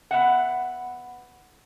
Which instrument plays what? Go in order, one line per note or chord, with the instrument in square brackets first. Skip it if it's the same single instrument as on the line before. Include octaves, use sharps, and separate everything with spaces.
[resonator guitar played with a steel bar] B3 E5 F#5